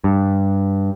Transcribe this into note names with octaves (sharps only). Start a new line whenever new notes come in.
G2